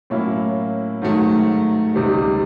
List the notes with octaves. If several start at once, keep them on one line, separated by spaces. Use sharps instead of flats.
A2 F#3 A#3 C#4 E4
G#2 D#3 F#3 A3
C#2 C3 D#3 G3